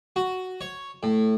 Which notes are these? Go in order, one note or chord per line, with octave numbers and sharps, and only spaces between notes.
F#4
C#5
A2